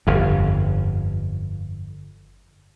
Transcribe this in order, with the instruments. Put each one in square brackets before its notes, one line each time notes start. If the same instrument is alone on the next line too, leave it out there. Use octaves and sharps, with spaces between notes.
[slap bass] G1 F2